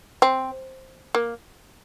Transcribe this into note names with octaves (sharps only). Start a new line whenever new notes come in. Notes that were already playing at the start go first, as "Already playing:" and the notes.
C4
A#3